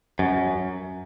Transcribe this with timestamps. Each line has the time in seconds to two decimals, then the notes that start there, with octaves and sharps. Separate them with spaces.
0.19 F#2